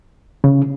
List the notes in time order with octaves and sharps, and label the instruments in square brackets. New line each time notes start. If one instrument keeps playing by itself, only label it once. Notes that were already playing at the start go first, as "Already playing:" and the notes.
[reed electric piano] C#3